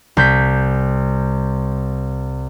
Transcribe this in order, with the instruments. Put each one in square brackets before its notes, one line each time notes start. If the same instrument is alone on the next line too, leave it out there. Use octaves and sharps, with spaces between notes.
[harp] C2 G6 B6